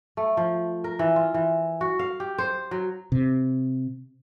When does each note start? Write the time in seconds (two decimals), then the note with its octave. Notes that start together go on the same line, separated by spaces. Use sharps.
0.17 A3
0.37 F3
0.84 A#4
0.99 E3
1.16 F4
1.34 E3
1.81 F#4
1.99 F5
2.20 G4
2.38 C5
2.71 F#3
3.12 C3